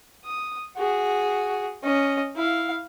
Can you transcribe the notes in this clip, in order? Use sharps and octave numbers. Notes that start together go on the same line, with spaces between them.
D#6
F#4 G#4
C#4 D#5
E4 F5